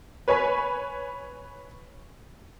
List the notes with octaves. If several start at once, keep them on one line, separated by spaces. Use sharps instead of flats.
B4 C#5 G#5 B5 B6